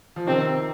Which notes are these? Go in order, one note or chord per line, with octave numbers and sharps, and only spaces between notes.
F3
C3 D#3 C4